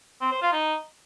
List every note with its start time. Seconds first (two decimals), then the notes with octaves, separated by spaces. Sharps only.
0.21 C4
0.32 C5
0.42 F4
0.53 D#4